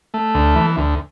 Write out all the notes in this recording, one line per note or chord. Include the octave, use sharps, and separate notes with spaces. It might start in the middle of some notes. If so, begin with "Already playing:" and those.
A3
D2
E3
D2